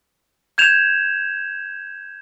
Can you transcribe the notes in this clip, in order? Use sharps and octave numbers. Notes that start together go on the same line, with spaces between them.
G6 G#6 E7 F7